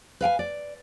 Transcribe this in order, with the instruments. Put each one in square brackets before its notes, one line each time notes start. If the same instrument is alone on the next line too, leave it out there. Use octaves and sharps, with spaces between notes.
[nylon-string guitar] B4 F5 G5 G#5
D5